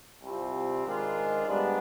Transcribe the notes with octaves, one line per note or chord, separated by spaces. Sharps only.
C2 C3 G3 C4 F4
G#2 D#3 G#3 D4 F4
G#2 G3 B3 D4